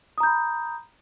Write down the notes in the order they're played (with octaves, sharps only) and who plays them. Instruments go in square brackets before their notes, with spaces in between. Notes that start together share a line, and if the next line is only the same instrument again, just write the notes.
[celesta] D#6
A#5
G6
B5